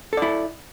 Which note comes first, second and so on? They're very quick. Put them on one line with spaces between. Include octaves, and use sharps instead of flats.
A4 D5 E4